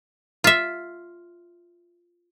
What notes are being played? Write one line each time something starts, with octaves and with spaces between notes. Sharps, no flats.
F4 E5